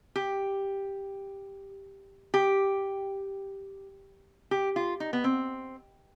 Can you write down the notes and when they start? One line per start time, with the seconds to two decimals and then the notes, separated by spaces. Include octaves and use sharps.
0.16 G4
2.34 G4
4.51 G4
4.76 F4
5.00 D#4
5.13 B3
5.24 C4